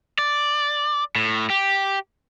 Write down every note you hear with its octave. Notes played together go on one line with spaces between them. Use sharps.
D5
A2
G4